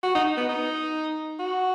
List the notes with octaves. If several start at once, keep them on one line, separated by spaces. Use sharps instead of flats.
F#4
D#4
B3
D#4
F#4